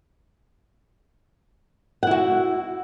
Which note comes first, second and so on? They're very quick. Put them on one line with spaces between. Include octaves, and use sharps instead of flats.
F#5 E4 F#4